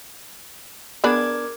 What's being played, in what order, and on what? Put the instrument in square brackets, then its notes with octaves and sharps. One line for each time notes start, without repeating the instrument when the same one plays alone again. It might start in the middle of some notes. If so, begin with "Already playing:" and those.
[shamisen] B3 D4 G#4 [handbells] A#4 D6 G#6